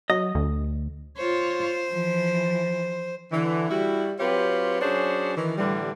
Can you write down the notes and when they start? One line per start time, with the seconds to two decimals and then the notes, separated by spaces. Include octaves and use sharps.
0.10 F#3 D#5
0.35 D2
1.17 F4 C5 C#5
1.89 E3 F3
3.32 D3 E3
3.69 G3 E4 F#4
4.19 F#3 C4 F4 G4 B4 C#5
4.81 F#3 C#4 D4 G#4 C5 C#5
5.36 D#3 E3
5.57 A2 D3 E3 G3